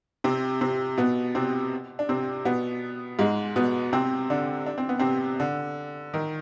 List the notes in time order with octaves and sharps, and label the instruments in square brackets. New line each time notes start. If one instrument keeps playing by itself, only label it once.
[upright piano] C3 C4
C3 C4
B2 B3
C3 C4
D4
C3 C4
B2 B3
G#2 G#3
B2 B3
C3 C4
D3 D4
D4
C4
B3
C3 C4
D3
D#3